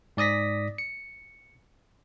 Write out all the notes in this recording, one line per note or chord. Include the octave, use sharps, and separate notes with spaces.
G#2 D5 D#6 A#6 B6
C#7